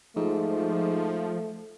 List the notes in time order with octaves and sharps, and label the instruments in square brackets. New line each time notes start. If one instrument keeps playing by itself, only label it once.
[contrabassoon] G#2 [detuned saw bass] F3 [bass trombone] A3